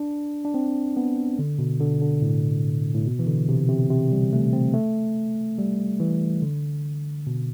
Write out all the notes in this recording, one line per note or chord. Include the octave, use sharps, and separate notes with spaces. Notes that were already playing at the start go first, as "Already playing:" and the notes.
Already playing: D4
D4
C4
B3
D3
B2
D3
D3
A2
A2
B2
E3
D3
C3
C3
C3
G3
A3
C4
A3
G3
E3
D3
B2